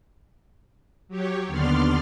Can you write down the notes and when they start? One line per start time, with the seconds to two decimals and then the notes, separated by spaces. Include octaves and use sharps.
1.08 F#3 G4 C#5
1.47 D#2 D3 B3 D5 C6 F6